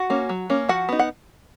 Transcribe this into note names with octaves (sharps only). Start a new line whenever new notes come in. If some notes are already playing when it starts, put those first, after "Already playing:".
Already playing: F#4 F#5
A#3 C#4
F#3
A#3 C#4
F3 F#4 F#5
B3 D#4
F#5